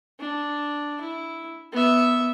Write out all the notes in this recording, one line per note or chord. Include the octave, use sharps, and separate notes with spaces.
D4
E4
B3 E5